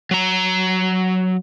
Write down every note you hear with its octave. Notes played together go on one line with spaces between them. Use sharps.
F#3 A#5